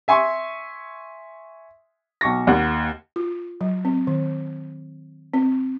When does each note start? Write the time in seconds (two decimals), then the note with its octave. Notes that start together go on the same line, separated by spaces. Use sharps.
0.08 E5 G#5 C6 C#6
2.21 B1 C#6 A#6
2.47 D#2 F#5
3.16 F4
3.61 F#3
3.85 C4
4.07 D#3
5.34 C4